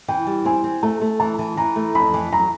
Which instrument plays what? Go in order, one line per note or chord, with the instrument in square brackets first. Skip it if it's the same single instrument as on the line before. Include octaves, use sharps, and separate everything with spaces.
[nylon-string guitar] E3 [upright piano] G5
[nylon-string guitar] G3
[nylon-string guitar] C4 [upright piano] G#5
[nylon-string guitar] C4
[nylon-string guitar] A3 [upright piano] A5
[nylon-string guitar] A3
[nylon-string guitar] E3 [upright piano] A5
[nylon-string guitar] E3
[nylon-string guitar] E3 [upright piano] A#5
[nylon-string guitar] A3
[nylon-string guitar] F2 [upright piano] B5
[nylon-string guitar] E3
[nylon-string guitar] F#3 [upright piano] A#5